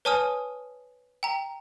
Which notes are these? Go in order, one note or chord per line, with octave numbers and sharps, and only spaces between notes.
B4 C#5 G#5 A5 D#6 F6
G5 A#5